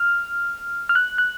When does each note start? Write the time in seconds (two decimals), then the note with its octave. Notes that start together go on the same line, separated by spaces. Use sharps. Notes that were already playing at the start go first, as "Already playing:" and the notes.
Already playing: F6
0.89 F6
0.95 F#6
1.18 F#6